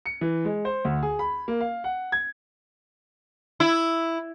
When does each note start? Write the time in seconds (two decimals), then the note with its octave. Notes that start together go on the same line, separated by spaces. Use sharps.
0.06 C#7
0.21 E3
0.45 G#3
0.65 C5
0.85 D2
1.03 G#4
1.19 B5
1.48 A#3
1.60 F5
1.84 F#5
2.12 G#6
3.60 E4